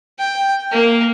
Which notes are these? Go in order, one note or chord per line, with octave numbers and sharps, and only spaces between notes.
G5
A#3